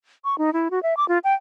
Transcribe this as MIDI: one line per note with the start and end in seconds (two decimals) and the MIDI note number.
0.24 0.38 85
0.38 0.53 63
0.53 0.68 64
0.71 0.82 66
0.83 0.97 76
0.97 1.07 86
1.08 1.18 65
1.24 1.34 79